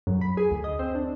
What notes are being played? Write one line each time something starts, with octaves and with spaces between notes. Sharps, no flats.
F#2
B5
G#4
D2
D#5
C4
D4